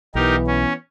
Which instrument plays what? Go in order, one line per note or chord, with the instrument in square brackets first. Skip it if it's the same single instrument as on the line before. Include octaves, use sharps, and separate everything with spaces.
[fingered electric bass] B1 [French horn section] E3 B3 [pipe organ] D#4 G4 A#4
[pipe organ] C#4